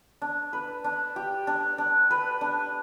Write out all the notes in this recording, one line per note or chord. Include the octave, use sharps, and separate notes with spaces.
D4
B4
D4
G4
D4
D4
B4
D4